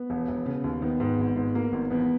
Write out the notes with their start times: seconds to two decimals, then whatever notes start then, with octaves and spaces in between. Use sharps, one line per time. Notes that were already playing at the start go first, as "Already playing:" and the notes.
Already playing: B3
0.10 E1
0.28 E1
0.46 C#3
0.64 D#2
0.82 D#3 B3
1.00 G#2
1.19 G#1
1.36 G#2
1.55 A#3
1.73 G#1
1.90 E2 B3